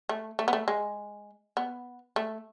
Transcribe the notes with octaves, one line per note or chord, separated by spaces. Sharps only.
A3
A3
B3
A3
G#3
B3
A3